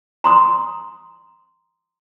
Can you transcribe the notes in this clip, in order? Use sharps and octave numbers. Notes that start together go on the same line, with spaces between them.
A#5 C6 D#6